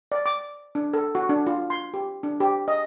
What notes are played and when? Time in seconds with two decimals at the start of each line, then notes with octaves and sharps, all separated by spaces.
0.12 D5
0.26 D6
0.75 D4
0.93 A4
1.15 F#4
1.29 D4
1.47 F4
1.70 C6
1.94 G4
2.23 D4
2.40 G4
2.68 D#5